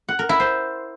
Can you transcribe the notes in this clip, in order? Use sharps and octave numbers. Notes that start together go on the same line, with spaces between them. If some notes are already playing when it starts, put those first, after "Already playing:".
F#5
A#4
E4
C5